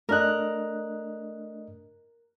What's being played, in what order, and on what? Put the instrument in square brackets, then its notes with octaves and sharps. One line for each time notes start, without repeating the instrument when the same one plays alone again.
[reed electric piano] A3 D4 D#5 [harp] A#4 F#6